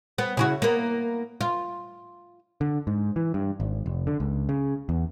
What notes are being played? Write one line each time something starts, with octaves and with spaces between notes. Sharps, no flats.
B3
C#3 E4 F#4
A#3 B3
F4
D3
G#2
E3
G2
G#1
F1
D3
C#2
C#3
E2